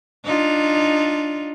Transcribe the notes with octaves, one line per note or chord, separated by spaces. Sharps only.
D4 D#4 F4